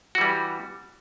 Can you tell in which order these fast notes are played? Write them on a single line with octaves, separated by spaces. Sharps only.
F#4 E3 G3